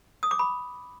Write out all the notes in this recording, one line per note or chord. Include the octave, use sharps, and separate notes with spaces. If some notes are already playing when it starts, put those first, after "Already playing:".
D#6
D6
B5